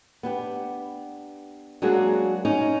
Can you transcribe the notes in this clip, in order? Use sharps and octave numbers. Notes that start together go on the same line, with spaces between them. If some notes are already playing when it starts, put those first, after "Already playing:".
B3 D4 G4
F#3 G#3 A#3 D4 F#4 G#4
C#4 D#4